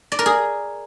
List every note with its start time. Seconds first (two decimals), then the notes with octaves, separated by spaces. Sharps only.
0.12 D5
0.19 A#4
0.26 G#4